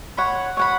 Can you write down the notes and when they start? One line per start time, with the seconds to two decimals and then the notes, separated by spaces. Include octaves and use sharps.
0.17 C#5 F#5 B5
0.57 C#5 F#5 B5